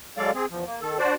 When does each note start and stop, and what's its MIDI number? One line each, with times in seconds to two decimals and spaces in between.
0.17 0.31 54
0.17 0.31 56
0.17 0.31 69
0.17 0.31 74
0.17 0.31 77
0.34 0.46 60
0.34 0.46 68
0.51 0.64 40
0.51 0.64 53
0.66 0.80 58
0.81 0.98 51
0.81 0.98 69
0.99 1.15 62
0.99 1.15 66
0.99 1.15 72
0.99 1.15 74